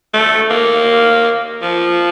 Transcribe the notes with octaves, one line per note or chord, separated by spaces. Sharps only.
A3
A#3
F3